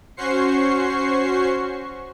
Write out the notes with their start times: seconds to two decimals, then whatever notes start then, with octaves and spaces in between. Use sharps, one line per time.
0.17 C#4 F#4 C5 C#6 C7